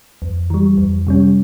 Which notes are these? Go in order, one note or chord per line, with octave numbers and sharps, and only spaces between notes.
F2
E3 G3
F2
C3 G3 C#4